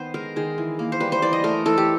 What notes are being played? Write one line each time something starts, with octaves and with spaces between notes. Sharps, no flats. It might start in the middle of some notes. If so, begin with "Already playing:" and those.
Already playing: D#3 B3 C5
G#3 A#4
D#3 G#4
E3
A#3
C5
G3 B4
C5
E3 D5
D#5
A3 A#4
E3 A4
G4